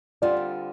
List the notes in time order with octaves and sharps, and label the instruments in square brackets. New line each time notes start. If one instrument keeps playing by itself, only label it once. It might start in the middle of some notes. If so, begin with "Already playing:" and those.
[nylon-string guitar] D3 G3 C4 F4 [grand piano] D5